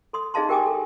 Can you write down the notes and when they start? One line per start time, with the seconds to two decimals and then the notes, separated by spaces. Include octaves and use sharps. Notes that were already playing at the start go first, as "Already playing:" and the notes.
0.13 A4 C6 D#6
0.34 D#4 G#4 D#5 F5 A5 C6
0.49 G4 A#4 G5 G#5 D6 D#6
0.66 A4